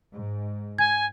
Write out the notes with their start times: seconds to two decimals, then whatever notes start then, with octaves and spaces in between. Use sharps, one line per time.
0.15 G#2
0.78 G#5 G#6